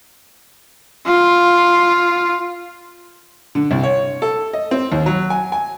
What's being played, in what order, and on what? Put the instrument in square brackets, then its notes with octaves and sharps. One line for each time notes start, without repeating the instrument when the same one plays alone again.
[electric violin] F4
[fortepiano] D3
C2
C#5
A4
D#5
C4
D#2
F#3
G#5
G#5